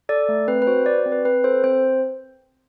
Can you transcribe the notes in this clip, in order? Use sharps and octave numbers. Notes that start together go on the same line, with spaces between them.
A4 D5
A3
C4 B4
B4
F#4 C5
F#4 D5
C4
B4
C4 B4
A4 C5
C4 C5